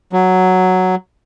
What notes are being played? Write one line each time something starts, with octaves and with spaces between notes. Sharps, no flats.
F#3